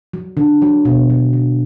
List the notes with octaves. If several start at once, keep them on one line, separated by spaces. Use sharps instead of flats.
F#3
D3
F#3
B2
F#3
D3